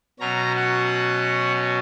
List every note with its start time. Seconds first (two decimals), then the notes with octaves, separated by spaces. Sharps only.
0.20 B2 F#3 C#4 A#5
0.56 F#5